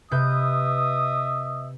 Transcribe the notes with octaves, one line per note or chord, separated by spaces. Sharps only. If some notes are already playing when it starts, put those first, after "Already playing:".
C3 B4 D#5 E5 D#6 G6